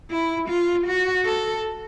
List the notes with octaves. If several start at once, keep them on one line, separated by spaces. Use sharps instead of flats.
E4
F4
F#4
A4